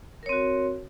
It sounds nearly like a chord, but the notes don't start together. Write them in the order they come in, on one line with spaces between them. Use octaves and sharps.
A#4 C#5 C4 F#4